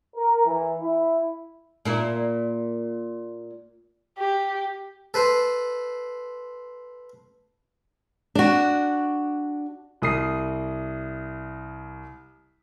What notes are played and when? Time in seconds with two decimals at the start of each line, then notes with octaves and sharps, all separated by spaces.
0.16 A#4
0.46 E3
0.81 E4
1.85 A#2 A#3 E4
4.18 G4
5.14 A4 B4 C5
8.35 D4 F#4
10.02 C2 D#6 C7